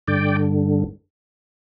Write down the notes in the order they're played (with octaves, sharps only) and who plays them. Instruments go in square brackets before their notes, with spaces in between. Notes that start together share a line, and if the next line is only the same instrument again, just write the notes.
[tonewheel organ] G2 D3 D5 G5